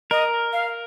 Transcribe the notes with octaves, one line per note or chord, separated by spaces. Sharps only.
A#4 D#5
F5